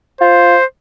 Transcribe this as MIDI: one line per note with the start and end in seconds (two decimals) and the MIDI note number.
0.21 0.56 65
0.21 0.65 72